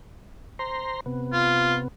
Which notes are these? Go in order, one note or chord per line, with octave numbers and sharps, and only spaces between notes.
C5 A#5 C6
C3 B3
F4